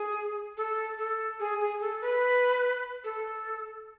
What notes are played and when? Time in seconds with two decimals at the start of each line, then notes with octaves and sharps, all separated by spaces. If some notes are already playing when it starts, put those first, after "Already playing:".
Already playing: G#4
0.57 A4
0.99 A4
1.40 G#4
1.60 G#4
1.81 A4
2.01 B4
3.04 A4